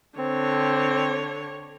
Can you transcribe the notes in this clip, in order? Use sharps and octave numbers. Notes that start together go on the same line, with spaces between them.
D3 C4 C#5